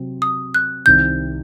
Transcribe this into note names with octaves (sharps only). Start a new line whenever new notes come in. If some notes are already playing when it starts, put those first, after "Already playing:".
Already playing: C3 F#3 C4
D#6
F#6
C2 C3 D#3 G6